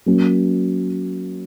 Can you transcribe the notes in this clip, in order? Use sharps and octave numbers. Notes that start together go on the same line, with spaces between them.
F#3 A#3 C#4